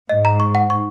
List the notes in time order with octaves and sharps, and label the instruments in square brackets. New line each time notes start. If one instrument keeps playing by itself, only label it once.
[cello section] G#2 [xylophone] D#5
[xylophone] A#5
C#6
F#5
C#6